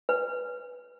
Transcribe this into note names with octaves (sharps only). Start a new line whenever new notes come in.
B4